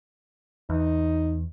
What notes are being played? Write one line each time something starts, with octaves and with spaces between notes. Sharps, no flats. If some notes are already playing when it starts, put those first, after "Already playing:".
E2 D#4